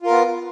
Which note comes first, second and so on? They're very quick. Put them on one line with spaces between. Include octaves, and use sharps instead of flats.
F4 A#4 B3